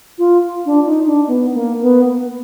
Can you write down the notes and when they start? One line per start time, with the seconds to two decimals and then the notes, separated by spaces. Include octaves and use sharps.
0.18 F4
0.66 D4
0.86 D#4
1.07 D4
1.27 B3
1.54 A#3
1.81 B3